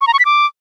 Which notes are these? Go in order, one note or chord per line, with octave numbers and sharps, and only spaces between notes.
C#6
A#5
C#6
B6
D6